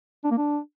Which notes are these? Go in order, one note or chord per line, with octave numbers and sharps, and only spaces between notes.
D4
A#3
D4